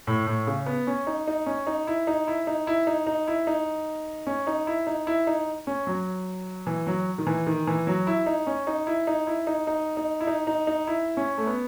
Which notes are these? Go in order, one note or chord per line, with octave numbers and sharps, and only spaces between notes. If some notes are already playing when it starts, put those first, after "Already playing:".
A2
A2
C#3
B3
C#4
D#4
D#4
C#4
D#4
E4
D#4
E4
D#4
E4
D#4
D#4
E4
D#4
C#4
D#4
E4
D#4
E4
D#4
C#4
F#3
E3
F#3
D#3
E3
D#3
E3
F#3
E4
D#4
C#4
D#4
E4
D#4
E4
D#4
D#4
D#4
E4
D#4
D#4
D#4
E4
C#4
A3
B3